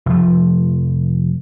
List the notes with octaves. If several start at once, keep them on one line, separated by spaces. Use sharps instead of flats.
F1 F3